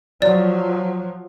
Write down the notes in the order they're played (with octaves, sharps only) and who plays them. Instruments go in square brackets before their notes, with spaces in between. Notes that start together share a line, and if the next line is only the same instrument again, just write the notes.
[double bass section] F3 F#3 [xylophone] D5